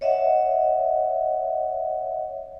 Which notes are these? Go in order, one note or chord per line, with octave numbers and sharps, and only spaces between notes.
C#5 D#5 E5 F#5